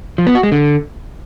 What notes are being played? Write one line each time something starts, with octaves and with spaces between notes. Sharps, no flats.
F3
B3
F#4
G#3
D3